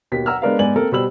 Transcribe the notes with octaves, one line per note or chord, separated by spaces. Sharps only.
D#2 B2 B6
F#5 A#5 E6 F6
G#3 B3 D4 A#4 B4 F5
G#2 B3 D5 G#5 F#7
A#3 C4 A4 A#4
B2 G3 C5 B5 E6 F#7